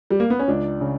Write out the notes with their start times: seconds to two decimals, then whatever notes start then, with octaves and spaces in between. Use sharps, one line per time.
0.10 G3
0.20 A#3
0.30 B3
0.40 C#4
0.48 C#2 D4
0.81 C#3